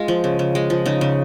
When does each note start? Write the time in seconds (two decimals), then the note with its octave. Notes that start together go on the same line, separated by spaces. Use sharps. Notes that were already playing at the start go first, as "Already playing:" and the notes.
Already playing: G#3 F4
0.08 F3
0.24 C#3
0.39 C#3
0.55 G#3
0.70 F3
0.86 C#3 D#4
1.01 C#3